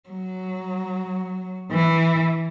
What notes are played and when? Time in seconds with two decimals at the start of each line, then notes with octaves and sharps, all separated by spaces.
0.09 F#3
1.71 E3